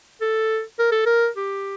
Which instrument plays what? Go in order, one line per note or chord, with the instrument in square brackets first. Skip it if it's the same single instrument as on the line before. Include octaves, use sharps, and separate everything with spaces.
[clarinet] A4
A#4
A4
A#4
G4